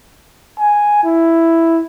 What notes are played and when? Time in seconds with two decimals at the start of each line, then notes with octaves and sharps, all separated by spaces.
0.59 G#5
1.04 E4